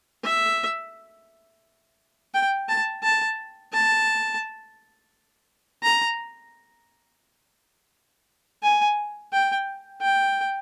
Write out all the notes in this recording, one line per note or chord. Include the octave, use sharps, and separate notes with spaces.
E5
G5
A5
A5
A5
A#5
G#5
G5
G5